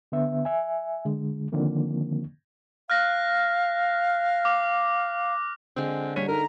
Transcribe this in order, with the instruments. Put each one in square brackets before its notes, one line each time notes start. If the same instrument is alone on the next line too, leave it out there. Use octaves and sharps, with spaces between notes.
[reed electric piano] D3 B3 E5
E5 G#5
D3 G#3
D3 D#3 F3 A#3 C4
[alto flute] F5 [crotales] F6 F#6 A#6
[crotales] D6
[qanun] D3 G#3 [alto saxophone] C4
[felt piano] G3 B6 D#7 [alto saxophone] C#5
[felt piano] D#4 A4 [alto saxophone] A#4 [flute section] A#5